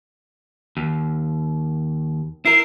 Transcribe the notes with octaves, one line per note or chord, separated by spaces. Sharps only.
D#2
E4 A#4 C7